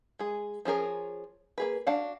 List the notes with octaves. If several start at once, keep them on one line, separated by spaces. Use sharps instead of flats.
G#3 G#4
F3 C#4 G#4 A#4
A#3 G#4 B4
D4 F#4 F5 F#5